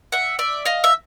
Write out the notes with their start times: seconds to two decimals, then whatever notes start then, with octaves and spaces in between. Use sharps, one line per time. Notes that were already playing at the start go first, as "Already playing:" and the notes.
0.12 E5 F#5
0.39 D5 E5
0.65 D#5 F5
0.84 E5